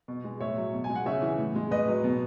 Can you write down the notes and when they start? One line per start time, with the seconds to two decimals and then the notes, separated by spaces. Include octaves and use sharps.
0.08 B2
0.24 G#3
0.40 A2 C#5 E5
0.57 F#3
0.73 B2
0.84 G#3 G#5
0.95 F#5
1.06 C#3 C#5 E5
1.22 E3
1.39 A2
1.55 G#3
1.71 A2 B4 D#5
1.88 F#3
2.04 B2